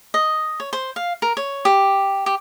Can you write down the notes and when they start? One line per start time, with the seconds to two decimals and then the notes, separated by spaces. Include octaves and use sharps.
0.14 D#5
0.60 C#5
0.73 C5
0.96 F5
1.22 A#4
1.37 C#5
1.65 G4
2.26 G4